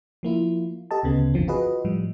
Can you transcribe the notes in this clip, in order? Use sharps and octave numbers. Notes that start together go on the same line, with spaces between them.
F3 A#3 E4 F4
G4 A4 D#5 A5
D2 C#3 B3
G1 D3 F3 C4
F4 F#4 G#4 B4 D#5
A2 F3 G3